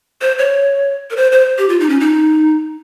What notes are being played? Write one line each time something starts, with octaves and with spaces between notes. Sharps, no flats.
C5
C#5
A#4
C5
C5
G4
F4
D#4
C#4
D#4